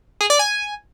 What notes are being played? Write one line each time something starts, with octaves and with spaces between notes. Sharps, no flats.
G#4
D5
G#5